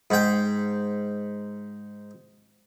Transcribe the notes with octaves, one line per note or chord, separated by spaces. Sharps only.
G#2 G5